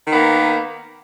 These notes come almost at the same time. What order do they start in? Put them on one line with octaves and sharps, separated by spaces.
D#3 B3 A#3